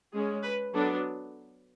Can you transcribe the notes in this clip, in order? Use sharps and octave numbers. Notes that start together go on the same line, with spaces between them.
G#3 C#4 G#4
B4
F#3 B3 D4 A4